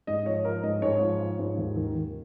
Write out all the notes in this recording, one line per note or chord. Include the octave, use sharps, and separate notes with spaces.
G#2 D#5
F3 C#5
F3 A#4
G#2 D#5
G#2 C#5
F3
F3
G#2
D#2
D#3
D#3